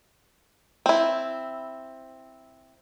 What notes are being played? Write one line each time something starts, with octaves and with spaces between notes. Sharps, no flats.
C4 E4